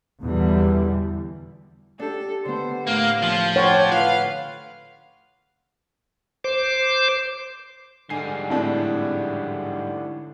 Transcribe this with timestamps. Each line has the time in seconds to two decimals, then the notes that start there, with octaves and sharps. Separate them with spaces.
0.23 E2 B2 D3 E3 G3
2.00 D4 G4 A4
2.45 D3 B3 C5
2.87 A2 A#3 F5
3.23 F3
3.56 C#5 F#5 G5 C6 D6
3.92 B4 F5
6.44 C5 D6
8.10 G#2 D3 G3 G#5 C7
8.50 A2 C4 D4 E4 D5